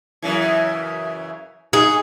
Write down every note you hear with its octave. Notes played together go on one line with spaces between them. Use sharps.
F#2 C#3 E3
D#4 F#4 G#4